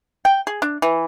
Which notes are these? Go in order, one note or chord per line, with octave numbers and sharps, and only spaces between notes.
G5
G#4
D4
E3